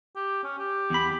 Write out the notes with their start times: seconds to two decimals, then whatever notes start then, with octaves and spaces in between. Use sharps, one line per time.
0.16 G4
0.43 C#4
0.58 G4
0.90 E2 B5